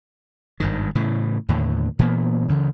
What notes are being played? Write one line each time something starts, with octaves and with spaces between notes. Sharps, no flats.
G#1 G2 D#3
A2 C#3 E3
D#2 A2 D3
A#2 E3 A#3 B3
D2 C#3 E3